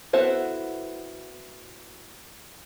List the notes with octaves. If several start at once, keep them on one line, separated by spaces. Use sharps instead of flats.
B3 E4 F#4 A4 C5